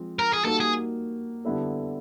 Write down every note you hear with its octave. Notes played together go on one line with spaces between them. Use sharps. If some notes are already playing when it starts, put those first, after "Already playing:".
Already playing: F3 G#3 C4
A#4
G#4
G3 A#3 D#4 F#4 A4 A#4
G#4
D3 G3 B3 E4 A4